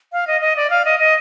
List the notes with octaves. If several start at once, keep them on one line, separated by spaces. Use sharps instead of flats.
F5
D#5
D#5
D5
F5
D#5
D#5